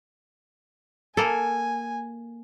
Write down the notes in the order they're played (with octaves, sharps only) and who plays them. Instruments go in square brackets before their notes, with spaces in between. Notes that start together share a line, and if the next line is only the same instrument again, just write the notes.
[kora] A#3 A4 [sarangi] G#5